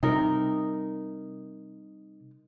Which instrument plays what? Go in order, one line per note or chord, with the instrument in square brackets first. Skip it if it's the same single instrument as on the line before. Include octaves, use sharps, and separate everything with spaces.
[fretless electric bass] C3 G3 [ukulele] D#4 A#4